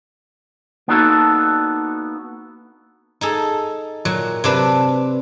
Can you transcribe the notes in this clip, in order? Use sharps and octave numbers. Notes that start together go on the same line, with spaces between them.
A#3 B3 D4 D#4 F#4 A4
D#4 G#4 A4
A#2 F#3
C3 D4 B4